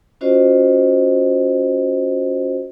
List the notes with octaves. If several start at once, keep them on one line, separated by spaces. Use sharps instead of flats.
C#4 F4 F#4 C5 D5 D#5